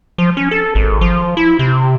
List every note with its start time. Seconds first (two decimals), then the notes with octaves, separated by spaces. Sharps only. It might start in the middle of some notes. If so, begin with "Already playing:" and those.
0.18 F3
0.37 C#4
0.51 A4
0.75 G#1
1.01 F3
1.37 E4
1.59 C3